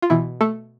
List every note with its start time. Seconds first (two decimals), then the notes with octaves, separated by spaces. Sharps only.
0.02 F4
0.10 B2 E3 E4
0.41 A3 A4